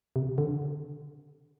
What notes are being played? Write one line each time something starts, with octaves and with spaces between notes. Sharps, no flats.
C3
D3